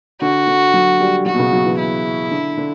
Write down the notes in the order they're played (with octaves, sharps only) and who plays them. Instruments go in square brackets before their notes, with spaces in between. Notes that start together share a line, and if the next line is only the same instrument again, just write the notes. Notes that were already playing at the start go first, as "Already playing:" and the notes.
[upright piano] D3 [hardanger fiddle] F#4
[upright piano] D3
F#3
G3
[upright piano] F#3 [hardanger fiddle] F#4
[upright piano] B2
C#3
F#3
E3
[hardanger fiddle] E4
[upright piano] D3
D3